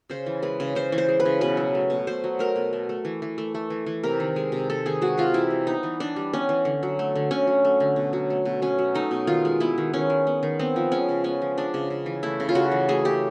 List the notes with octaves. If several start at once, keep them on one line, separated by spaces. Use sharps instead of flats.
C#3 C5
E3
G#3 B4
C#3
C#3 C5
E3
C5
G#3
B4
C#3
B2 B4
F#3
A3
B2
B2 C5
F#3
A3 A#4
B2
A3
A3
E3
E3
A3
A3
E3
E3
C3 A#4
D#3
G#3
C3
C3 A4
D#3 G#4
G#3 F#4
C3 F4
E3 E4
G3
B3 D#4
E3
E3 D4
G3
B3 C#4
E3
D3
F#3
A3
D3
D3 C#4
F#3
A3
D3
B2
F#3
A3
B2
B2 C#4
F#3
A3 D#4
B2
D#3 F4
G#3
B3 E4
D#3
D#3 C#4
G#3
B3
D#3
B3 C4
F3
G#3 C#4
C#3
B3 C#4
F3
G#3 D4
C#3
C#3
E3
A3 E4
C#3
F4
C#3 F#4
E3
A3 G#4
C#3 G4